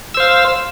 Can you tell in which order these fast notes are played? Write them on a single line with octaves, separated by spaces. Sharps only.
E6 C5 F5